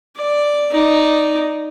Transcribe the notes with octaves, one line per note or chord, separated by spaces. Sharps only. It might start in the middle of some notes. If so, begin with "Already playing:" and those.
D5
D#4 D5